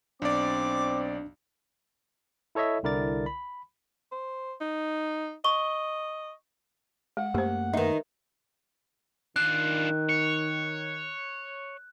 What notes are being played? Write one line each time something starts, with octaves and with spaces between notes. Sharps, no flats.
B1 C4 D4 D5 D6
E4 A4 C#5 D#5 E5
C2 D3 E4 A#4 D5 A6
B5
C5
D#4
D#5 C#6 G7
G#3 F#5
F#2 A3 A#3 G4 C5
D#3 D#4 B4 E5
D#3 D4 F4 F#6
C#5